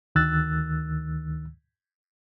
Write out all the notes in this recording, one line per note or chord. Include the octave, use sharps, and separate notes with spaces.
D2 D#3 E6 F#6 A6